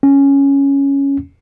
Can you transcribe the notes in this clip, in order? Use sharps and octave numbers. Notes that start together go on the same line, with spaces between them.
C#4